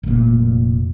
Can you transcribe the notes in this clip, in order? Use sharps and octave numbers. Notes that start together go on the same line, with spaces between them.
F1 A#2